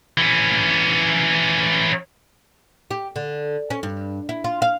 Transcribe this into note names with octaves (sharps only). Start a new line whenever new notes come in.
E3 C#4
G4
D3
C#4
G2
E4
F4
F5